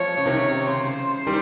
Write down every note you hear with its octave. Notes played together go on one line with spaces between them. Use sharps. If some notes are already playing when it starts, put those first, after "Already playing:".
Already playing: F3 C#5
C#3
C3 D#3
C#3 C5
D#3 G3